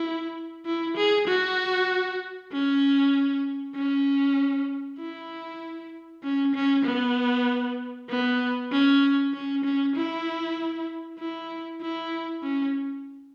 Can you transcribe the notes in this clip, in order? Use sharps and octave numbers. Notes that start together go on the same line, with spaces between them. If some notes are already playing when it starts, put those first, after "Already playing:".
Already playing: E4
E4
G#4
F#4
C#4
C#4
E4
C#4
C#4
B3
B3
C#4
C#4
C#4
E4
E4
E4
C#4